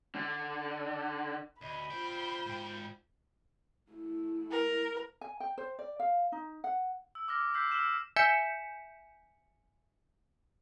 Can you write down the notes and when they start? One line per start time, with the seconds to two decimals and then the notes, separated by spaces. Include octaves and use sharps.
0.15 D3
1.61 D2 D#5 B5
1.91 D4 F4 C5 G5
2.46 G#2 G5
3.92 A3 E4
4.51 A#4
5.21 G#5
5.40 G5
5.58 C5
5.79 D5
6.00 F5
6.32 D#4
6.64 F#5
7.15 E6
7.28 D6 F6 A#6
7.54 D6 E6 G6 B6 C7
7.71 E6 F6 B6 E7
8.16 E5 G#5 G6 B6 C#7 E7